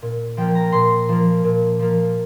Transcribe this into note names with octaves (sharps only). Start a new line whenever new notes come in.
A#2
F3 A#3 G5
A#5
A#2 C6
F3 A#3
A#2
F3 A#3